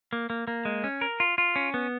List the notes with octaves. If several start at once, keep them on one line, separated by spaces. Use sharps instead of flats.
A#3
A#3
A#3
G#3
C#4
A#4
F4
F4
C#4
B3